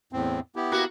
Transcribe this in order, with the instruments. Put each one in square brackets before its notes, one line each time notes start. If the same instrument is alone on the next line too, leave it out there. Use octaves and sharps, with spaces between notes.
[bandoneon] E2 A2 C4
B3 E4 G4
[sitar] A#3 F#4